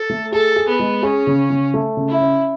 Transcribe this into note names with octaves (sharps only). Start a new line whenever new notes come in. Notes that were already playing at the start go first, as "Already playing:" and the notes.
Already playing: A4
A3
G#4 A4
G#4
B3
G#3
C#4 G#4
C#3
C#3
A3
C#3
E4
C#4